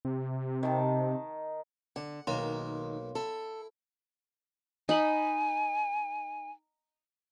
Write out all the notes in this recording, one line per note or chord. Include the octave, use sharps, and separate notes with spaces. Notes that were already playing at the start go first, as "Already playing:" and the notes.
C3
D#3 A5
D3 F#5
B1 D#3 A#3 E4 C#5 F5 C6
E4 A4
D#4 G#5 B5